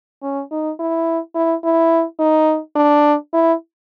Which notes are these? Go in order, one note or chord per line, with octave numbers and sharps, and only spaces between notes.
C#4
D#4
E4
E4
E4
D#4
D4
E4